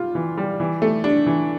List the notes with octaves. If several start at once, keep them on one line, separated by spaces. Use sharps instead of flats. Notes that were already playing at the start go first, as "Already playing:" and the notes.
Already playing: G3 F4
E3
G3
E3
A3
D4
E3